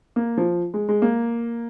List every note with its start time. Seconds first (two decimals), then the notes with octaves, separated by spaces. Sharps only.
0.16 A#3
0.37 F3
0.74 G#3
0.89 G#3
1.02 A#3